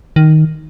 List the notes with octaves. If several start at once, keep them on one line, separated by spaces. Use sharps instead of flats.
D#3